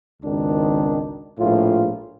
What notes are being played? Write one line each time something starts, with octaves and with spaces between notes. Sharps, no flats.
G#1 C#2 D#3 D4
A#1 A2 F4